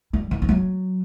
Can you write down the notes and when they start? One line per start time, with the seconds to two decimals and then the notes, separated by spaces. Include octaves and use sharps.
0.13 G3
0.31 E3
0.42 E3
0.49 F#3